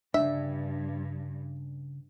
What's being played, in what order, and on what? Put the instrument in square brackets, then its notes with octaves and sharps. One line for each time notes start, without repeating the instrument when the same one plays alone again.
[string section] G2 [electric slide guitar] C#3 G5 [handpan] D4 [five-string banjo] E5